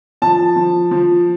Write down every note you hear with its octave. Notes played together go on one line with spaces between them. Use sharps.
F3 A5
F3
F3